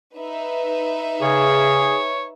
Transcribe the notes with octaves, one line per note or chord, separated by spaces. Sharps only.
D#4 B4 E5
C#3 G#4 C#5